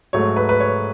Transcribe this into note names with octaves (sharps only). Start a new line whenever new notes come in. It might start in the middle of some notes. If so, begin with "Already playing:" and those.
G#2 F#3 A3 C#5
B4
B4
C#5